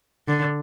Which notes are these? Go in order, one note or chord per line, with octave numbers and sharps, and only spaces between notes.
D3